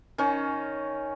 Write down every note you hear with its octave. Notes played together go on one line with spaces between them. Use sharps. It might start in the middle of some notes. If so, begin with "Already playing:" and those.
D#3 C#4